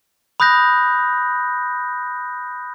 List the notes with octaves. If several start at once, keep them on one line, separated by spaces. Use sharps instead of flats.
B5 D#6 F#6 G6 A#6